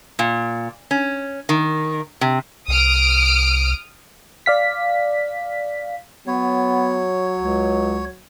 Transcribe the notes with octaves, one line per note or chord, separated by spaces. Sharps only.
A#2
C#4
D#3
C3
C2 D#6 F6 D7
D5 F5 B6
F#3 B3 C#5
C#2